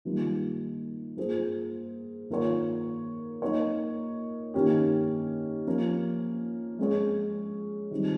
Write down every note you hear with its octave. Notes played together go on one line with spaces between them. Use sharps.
D#3 G3 A#3 F4
A#3 F4 G#4 C5
D#3 A#3 F4 A#4 C#5
A#3 D#4 A#4 C#5
D#3 A#3 C#4 G4
F3 A#3 C#4
G#3 C#4 G#4 C#5
D#3 G3 C4 F4